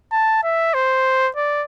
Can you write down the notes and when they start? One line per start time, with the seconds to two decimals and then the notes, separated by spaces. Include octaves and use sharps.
0.12 A5
0.43 E5
0.74 C5
1.36 D5